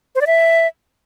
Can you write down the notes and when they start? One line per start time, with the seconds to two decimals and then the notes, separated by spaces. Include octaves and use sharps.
0.15 C5
0.21 D5
0.27 E5